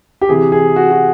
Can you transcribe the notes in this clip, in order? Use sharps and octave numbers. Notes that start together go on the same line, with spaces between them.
G4
C3 E3 G#4
G#4
F#4
F#4